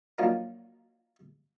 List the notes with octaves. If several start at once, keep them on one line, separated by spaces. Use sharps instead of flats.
F3 F#3 A#3 D4 D#4